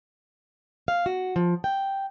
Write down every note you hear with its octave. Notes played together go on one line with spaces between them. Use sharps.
F5
F#4
F3
G5